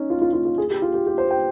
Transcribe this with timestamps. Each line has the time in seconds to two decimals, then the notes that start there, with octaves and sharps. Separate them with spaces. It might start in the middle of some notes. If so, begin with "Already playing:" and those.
Already playing: C#4 D#4
0.10 F4
0.22 F4
0.33 F4
0.45 F4
0.58 G#4
0.70 G4
0.82 F4
0.94 G4
1.07 G4
1.18 C5
1.31 G5